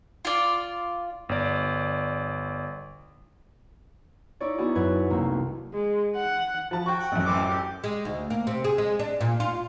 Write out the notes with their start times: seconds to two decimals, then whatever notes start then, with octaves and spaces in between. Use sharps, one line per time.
0.25 F4 D5
1.29 G1 D5
4.40 D#4 E4 C#5 D5
4.58 B3 D#4 E4 F#4 G#4
4.75 F#2 B4 G#6
5.10 C2 C3 A3 A#3
5.74 G#3
6.16 F#5
6.71 F3 A5
6.86 F#4 G5 C#6
6.99 F#5
7.12 A1 F#2
7.25 E3 C4 D6
7.47 G4
7.84 G#3
8.05 D2
8.30 A#3
8.47 C3
8.64 G#4
8.78 G#3
8.99 D4
9.21 A#2
9.40 F4